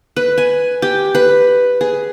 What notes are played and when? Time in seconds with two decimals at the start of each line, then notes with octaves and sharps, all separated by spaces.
0.16 B4
0.38 G#5
0.82 G4
1.15 B4
1.81 G#4